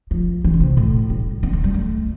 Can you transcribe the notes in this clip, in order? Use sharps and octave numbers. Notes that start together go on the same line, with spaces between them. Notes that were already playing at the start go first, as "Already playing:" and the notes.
F3
E3
D3
C3
A2
G3
B3
A3
G3
A3